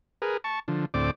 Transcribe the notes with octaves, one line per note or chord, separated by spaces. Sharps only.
G#4 A#4 B4
A5 C#6
D3 F3
D2 A2 C4 D5 D6